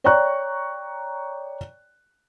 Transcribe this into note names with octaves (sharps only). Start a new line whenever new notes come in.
C#5 D5 G5 A#5 C#6 F#6